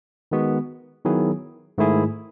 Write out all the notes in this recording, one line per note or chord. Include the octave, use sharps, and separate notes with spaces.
D#3 G#3 B3 F#4
D#3 F#3 B3 E4 G#4
G#2 D#3 A3 E4 G#4